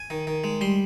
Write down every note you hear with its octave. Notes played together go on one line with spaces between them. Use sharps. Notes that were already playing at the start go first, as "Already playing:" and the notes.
Already playing: G#5
D#3
D#3
G#3
G3 C6